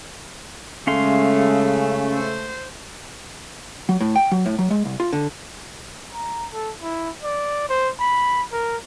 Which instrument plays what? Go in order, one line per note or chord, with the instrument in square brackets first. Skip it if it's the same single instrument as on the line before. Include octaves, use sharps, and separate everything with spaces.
[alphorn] C#3 [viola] G#3 [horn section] A3 [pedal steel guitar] C#4 F5 C6
[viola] C5
[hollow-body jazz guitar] F#3
A2
G5
F#3
A2
F#3
G#3
C2
F4
D3
[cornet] A#5
A4
E4
D5
C5
B5
A#4